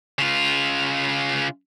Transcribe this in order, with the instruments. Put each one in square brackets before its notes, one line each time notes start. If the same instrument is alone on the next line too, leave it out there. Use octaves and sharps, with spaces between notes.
[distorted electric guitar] C#3 F4